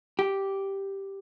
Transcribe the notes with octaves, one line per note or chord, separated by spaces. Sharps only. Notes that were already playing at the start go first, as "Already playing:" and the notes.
G4